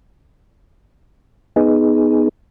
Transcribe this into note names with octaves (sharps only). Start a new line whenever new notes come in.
B3 D#4 G#4